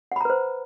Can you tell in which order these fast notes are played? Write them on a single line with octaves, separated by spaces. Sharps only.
F#5 B5 A#5 B4 C5